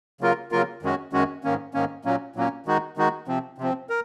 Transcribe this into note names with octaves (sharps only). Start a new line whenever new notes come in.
C#3 F#3 A#3 F4 A#4
C#3 F#3 A#3 F4 A#4
F#2 D#3 G#3 C#4 F#4
F#2 D#3 G#3 C#4 F#4
G#2 D#3 A#3 C#4
G#2 D#3 A#3 C#4
A#2 F#3 A#3 C#4
A#2 F#3 A#3 C#4
D#3 G#3 D#4 F#4
D#3 G#3 D#4 F#4
C3 F3 C4
C3 F3 C4
A#4